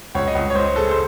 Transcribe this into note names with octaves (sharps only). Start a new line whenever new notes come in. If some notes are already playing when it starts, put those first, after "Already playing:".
C#2 C#5
D#5
C#2
C#5
C#2 C5
G#3 A4
C5